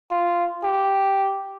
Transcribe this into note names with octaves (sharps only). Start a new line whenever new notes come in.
F4
G4